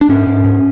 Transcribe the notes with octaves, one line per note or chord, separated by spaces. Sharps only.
D4
G#2 C#4
G#2
G#2